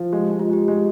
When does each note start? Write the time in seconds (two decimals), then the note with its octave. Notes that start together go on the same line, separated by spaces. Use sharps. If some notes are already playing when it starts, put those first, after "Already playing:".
Already playing: F3
0.13 G#3 G4
0.27 G#3 G4
0.39 F4
0.50 G#3 G4
0.68 G#3 G4